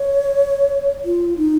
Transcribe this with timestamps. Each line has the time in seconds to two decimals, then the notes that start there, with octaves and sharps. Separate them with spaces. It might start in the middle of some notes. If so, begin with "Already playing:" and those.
Already playing: C#5
1.05 F4
1.38 D#4